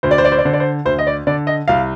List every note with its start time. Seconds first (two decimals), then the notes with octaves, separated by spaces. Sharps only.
0.03 D2 C5
0.11 D5
0.18 C5
0.25 D5
0.32 C5
0.38 D5
0.45 D3 C5
0.53 D5
0.60 C5
0.85 D2 C5
0.99 D#5
1.07 D5
1.27 D3 D5
1.47 D#5
1.68 C2 F5